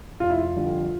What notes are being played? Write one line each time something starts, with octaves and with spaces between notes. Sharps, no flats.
F1 F4
E4
F4
F2 D3 G3